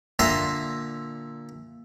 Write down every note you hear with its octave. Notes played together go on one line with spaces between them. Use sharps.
A#2 D3 E5 A#5 C6 D#6